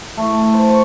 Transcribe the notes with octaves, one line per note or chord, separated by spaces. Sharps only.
A3
A4
C5
C#6